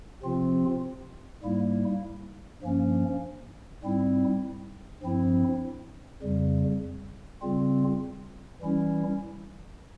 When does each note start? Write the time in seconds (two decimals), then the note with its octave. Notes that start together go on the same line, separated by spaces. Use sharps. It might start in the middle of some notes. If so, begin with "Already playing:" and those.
0.23 C3 F3 C4 F4
1.43 G#2 G3 A#3 E4
2.62 G2 F3 A#3 C#4
3.83 G#2 G3 C4 E4
5.02 G2 F3 C4 E4
6.22 F2 C#3 G3
7.42 C#3 G3 C4 F4
8.62 E3 G3 C#4 E4